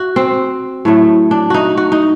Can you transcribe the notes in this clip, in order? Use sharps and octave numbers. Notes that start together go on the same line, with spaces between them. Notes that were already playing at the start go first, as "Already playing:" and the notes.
Already playing: F#4
C4
A2 F#3 A3
D4
D#4 F#4
F#4
D#4